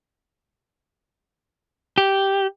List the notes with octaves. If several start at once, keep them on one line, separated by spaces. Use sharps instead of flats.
G4